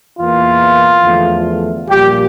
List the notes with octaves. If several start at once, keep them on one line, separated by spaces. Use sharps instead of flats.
E2 E3 A#3 F4
E2 D3 F3 A3
A#1 A#2 G3 A#3 G4